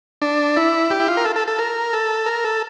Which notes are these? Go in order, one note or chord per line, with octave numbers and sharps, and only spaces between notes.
D4
E4
G4
E4
F4
A#4
A4
A4
A4
A#4
A4
A#4
A4